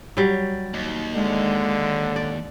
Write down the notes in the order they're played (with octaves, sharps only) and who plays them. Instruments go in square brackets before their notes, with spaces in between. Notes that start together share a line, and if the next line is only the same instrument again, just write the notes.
[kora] F#3 G3
[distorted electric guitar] D#2
[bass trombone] D3 [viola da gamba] G#3
[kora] D5